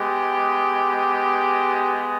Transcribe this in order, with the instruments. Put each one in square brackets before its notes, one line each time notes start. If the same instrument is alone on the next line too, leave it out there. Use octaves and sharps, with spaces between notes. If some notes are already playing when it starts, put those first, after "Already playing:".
Already playing: [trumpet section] G#3 B3 G4